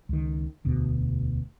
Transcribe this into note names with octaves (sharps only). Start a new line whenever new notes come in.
C#2 D#3
E1 D2 B2